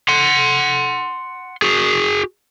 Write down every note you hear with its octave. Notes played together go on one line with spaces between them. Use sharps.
F#5 C6
F#4 G#4